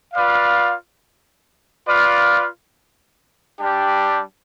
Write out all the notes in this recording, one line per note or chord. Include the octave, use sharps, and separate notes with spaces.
F4 B4 D5 F5
F4 B4 D5 F5
G3 D4 G4